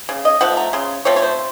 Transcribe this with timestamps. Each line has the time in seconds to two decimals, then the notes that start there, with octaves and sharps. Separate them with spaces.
0.09 C#3
0.25 D#5
0.41 F3 A3 F#5
0.57 A#5
0.73 C#3 C6
1.05 F3 A3 C4 C#5
1.16 C#5
1.22 C5